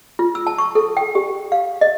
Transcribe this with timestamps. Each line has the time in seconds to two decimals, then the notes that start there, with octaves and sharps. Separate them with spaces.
0.19 F4
0.35 E6
0.47 A5
0.58 C#6
0.75 A4
0.97 G5
1.15 G4
1.52 F5
1.81 D#5